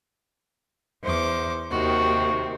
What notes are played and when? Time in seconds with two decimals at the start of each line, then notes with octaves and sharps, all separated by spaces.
1.04 E2 C5 D6
1.71 D#2 C3 D#3 F#4